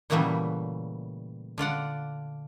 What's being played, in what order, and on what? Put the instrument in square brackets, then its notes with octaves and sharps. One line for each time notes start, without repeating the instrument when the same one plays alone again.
[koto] A#2 C#3 E3 F#3 G3 A3
D3 F4 D5 F#5